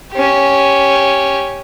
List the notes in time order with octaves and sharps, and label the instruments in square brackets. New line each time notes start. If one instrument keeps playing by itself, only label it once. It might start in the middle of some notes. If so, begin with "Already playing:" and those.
[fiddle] C#4 G4